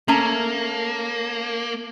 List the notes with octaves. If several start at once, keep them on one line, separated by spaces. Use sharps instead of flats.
A3 A#3 C#4 A#5